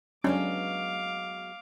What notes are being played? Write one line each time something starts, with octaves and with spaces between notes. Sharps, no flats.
F#3 G#3 B3 C#4 D4 F5 D6